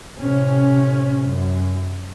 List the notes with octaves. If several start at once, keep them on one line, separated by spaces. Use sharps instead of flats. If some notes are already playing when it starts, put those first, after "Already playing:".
A2 C3 C#4
F#2